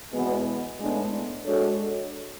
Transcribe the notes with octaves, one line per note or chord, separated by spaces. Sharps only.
E2 B2 G#3 B3
A2 G#3 B3 D4
G#3 D4 F#4 A4 C#5